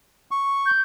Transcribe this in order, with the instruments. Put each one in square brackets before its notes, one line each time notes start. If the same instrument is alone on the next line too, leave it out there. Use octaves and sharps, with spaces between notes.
[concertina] C#6
[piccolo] G6